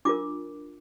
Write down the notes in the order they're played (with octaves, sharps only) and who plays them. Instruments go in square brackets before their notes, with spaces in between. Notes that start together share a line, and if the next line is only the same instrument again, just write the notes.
[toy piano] D4 F4 A#4 D6